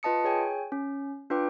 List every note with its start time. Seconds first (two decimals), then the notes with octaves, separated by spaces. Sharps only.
0.03 F4 B4 D#5 A5 D#6 C#7
0.24 G#4 C#5 G5 G#5
0.72 C#4
1.30 D4 F4 B4 G5 D6